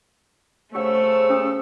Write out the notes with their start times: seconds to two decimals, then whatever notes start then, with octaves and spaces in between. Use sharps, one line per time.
0.75 C#3 A3 G4 C5 C#5 F#5 C#6 E6
1.30 C#4 G4 D#6